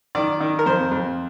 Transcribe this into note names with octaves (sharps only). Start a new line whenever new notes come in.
D#3 D5
D#3
A#4
F2 C5
F2